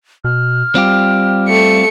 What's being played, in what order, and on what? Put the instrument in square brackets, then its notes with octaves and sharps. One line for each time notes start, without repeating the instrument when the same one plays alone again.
[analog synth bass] B2 [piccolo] F6
[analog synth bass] G3 [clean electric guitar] C4 F4 G4
[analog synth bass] G3 [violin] A3 C#7